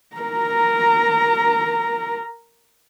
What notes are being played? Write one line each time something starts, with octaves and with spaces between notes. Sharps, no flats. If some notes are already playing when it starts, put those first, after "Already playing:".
A#4 A#5